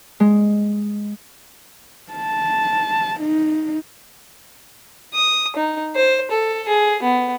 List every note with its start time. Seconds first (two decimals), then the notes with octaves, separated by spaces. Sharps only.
0.20 G#3
2.13 A5
3.21 D#4
5.14 D#6
5.56 D#4
5.95 C5
6.31 A4
6.68 G#4
7.03 B3